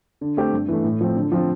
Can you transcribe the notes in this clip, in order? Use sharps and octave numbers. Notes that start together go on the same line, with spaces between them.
D3
A3 C4 G4
G2
E3 A3
A2
F3 C4
D3
F3 C4 F4